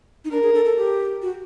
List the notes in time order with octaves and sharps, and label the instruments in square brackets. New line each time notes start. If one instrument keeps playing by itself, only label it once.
[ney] D#4
[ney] D4 [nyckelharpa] A#4
[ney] G#4
A4
A4
G4
F#4